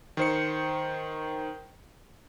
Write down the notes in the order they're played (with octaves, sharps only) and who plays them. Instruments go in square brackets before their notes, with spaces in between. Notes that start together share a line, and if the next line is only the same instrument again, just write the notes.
[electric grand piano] D#3 C5 C#7